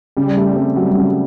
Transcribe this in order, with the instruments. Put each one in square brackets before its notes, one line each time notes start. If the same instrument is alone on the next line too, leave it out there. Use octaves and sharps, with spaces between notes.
[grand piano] C#3 [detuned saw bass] G3
[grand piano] A3
C4
F#3
C#3